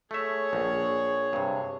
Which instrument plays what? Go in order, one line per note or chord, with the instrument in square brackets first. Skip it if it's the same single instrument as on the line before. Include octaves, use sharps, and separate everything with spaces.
[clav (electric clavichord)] A3 E5 [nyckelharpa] G#4 C#5
[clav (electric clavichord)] A#1
G2 C3